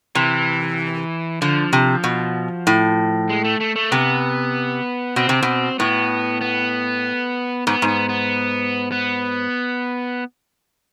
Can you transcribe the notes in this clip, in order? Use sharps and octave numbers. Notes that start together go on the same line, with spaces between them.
C3 E3
D3 F3
C3
B2
A2
G#3
A3
A3
A3
C3 B3
B2 C4
C3
B2
A2 B3
B3
G#2 B3
G#2
B3
B3
B3